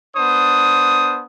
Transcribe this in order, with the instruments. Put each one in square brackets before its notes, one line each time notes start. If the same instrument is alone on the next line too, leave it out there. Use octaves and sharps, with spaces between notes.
[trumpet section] B3 D4 C5 D#6